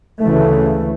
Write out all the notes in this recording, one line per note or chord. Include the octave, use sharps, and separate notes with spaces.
D2 C#3 E3 A3